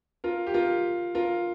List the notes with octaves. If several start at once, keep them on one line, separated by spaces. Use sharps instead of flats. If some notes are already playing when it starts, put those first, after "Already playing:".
F4 A#4
G4
F4 A#4
F4 A#4